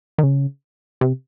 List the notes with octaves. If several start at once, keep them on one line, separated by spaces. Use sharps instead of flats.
D#3
C#3
C3